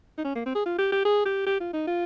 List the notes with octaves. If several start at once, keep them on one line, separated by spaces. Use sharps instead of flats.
D#4
C#4
A#3
C4
G#4
F4
G4
G4
G#4
G4
G4
F4
D#4
F4